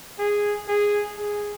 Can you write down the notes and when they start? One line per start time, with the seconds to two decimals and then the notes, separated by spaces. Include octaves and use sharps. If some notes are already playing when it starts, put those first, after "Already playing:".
0.19 G#4
0.68 G#4
1.17 G#4